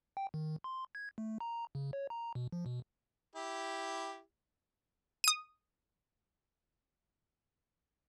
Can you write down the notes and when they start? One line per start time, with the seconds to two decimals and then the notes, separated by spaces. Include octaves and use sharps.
0.17 G5
0.34 D#3
0.64 C6
0.95 G#6
1.18 A3
1.40 A#5
1.75 C#3
1.93 C#5
2.10 A#5
2.35 B2
2.52 F3
2.66 B2
3.35 E4 G4
5.24 D#6 D#7